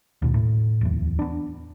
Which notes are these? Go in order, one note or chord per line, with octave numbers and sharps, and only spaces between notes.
D#2 B2
A2
D1 E2
B3 D4